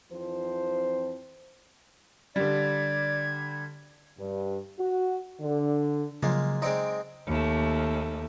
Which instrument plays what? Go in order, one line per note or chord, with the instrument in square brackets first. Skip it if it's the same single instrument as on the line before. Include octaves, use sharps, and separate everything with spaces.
[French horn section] F2 E3 F3 C4 C5
[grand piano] D3 G3 [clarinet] D5 [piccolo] G#6
[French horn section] G2
F#4
D3
[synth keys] C#3 F3 F#3 [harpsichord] G#3 A#3 F4
[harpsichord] G#3 C4 D#4 [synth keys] D5 C6 D7
[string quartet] D#2 A3